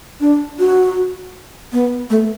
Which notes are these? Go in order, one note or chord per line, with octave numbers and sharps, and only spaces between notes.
D4
F#4
B3
A3